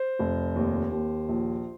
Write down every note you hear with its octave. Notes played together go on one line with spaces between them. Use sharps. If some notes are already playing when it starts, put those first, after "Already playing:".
Already playing: C5
F1
D#2
D#2
A#1